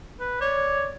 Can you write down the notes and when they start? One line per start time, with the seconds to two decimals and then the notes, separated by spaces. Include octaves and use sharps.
0.20 B4
0.41 C#5 D5